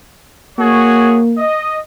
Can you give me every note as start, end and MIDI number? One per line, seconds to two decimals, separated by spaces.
0.58 1.43 58
0.58 1.20 66
0.58 1.20 68
0.58 1.20 73
1.37 1.79 75